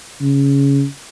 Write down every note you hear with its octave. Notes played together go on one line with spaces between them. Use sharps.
C#3